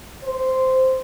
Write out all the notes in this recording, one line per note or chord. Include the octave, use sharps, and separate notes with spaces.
C5